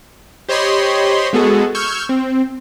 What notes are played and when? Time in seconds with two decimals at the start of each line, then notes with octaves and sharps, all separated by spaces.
0.49 G4 C5 C#5 D#5 B5 C6
1.33 G#3 B3 F#4 G#4 A4
1.75 C#6 E6 F6 G6 G#6
2.09 C4